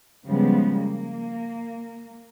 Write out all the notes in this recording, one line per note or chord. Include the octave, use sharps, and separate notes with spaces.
C#3 F3 G3 G#3 B3
A#3